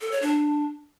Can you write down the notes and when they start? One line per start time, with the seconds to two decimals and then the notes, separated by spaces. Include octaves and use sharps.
0.01 A4
0.11 C#5
0.22 D4